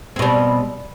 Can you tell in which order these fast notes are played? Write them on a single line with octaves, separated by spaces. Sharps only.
C4 B2 G3